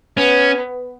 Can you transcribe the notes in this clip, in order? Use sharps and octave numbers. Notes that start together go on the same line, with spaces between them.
B3 C#4